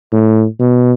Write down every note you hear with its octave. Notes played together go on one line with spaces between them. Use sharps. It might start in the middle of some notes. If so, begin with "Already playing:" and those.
A2
B2